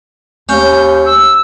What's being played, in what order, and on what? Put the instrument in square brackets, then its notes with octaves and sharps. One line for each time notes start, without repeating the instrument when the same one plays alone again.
[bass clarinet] D#2 [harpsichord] C#4 [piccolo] G6
[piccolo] E6